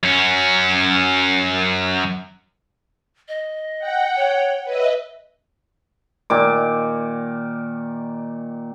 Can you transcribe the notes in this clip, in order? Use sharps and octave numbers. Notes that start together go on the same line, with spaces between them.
F#2 C#4
D#5
F#5 G5
C#5
B4 C#5 D#5 E5
A#2 D#3 D6